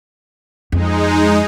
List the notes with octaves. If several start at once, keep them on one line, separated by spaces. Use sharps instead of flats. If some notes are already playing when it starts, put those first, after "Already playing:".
F2 G#3 D#4